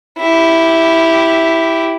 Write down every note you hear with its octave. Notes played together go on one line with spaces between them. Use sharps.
E4 G4